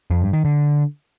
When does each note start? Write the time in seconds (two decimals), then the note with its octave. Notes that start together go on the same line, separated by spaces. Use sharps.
0.11 F2
0.22 G2
0.33 D#3
0.45 D3